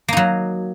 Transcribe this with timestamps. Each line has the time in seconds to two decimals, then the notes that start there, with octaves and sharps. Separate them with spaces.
0.08 A#3
0.13 D#4
0.17 F#3